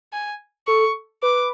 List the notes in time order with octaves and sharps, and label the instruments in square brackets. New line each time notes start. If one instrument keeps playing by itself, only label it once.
[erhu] G#5
[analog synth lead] A4 [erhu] C#6
[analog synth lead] B4 [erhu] D6